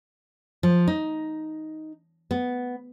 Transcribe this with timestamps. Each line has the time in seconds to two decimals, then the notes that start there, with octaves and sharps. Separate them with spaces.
0.63 F3
0.87 D#4
2.31 B3